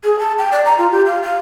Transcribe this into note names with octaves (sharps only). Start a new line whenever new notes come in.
G#4
A5
G5
D5
A#5
F4
G4
F5
F5